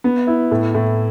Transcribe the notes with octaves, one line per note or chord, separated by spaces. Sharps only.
B3
E4
A2
A2